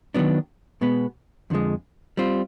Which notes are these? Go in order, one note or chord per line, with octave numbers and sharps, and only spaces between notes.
D#3 F#3 B3 D4
B2 G#3 B3
F2 D3 F3 G#3
G3 C4 F4